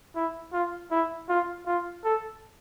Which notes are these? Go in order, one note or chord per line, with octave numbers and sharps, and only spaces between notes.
E4
F4
E4
F4
F4
A4